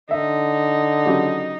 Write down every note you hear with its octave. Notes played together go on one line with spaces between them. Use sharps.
D3 D#4 E5
C#3 F#3 G4